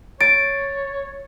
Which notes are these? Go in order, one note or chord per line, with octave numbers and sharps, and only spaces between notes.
C#5 A6 D7